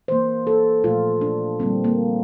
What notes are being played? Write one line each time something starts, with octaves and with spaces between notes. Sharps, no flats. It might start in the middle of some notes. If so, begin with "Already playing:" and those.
E3 A#3 C5
A4
A#2 F3 A3 F4
D4
D3 G3 A#3 C4
A#3